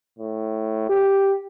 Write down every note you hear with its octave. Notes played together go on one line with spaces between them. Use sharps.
A2
G4